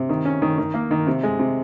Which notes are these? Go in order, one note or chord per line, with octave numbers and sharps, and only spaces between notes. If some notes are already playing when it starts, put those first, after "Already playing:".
Already playing: C3
D#3
C#4
D#3
D#3
A#3
D#3
C3
G#3
C3